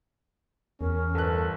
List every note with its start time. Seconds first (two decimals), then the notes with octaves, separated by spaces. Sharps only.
0.81 E2 C#4 A#4
1.15 G1 A4 F#6